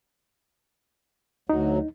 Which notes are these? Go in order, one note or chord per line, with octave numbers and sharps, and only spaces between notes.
D2 F#3 D#4